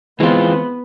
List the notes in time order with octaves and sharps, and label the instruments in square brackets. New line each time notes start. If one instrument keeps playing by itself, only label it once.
[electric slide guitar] E3 G#3 C4 F4 [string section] B3